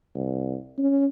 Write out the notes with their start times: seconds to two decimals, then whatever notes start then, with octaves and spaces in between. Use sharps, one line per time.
0.15 C2
0.78 C#4